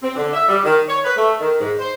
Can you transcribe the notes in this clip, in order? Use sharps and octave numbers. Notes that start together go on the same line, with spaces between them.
C4
D3
E5
G3
D#3
C#5
B4
A3
D#3
G#2
C5